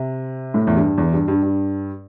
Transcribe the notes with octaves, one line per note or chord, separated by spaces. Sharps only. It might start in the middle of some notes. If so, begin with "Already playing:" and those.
Already playing: C3
A2
E2
G2
E2
G2
G2
G2